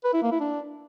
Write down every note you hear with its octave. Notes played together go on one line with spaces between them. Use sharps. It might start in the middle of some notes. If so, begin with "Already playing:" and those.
B4
E4
A#3
E4
D4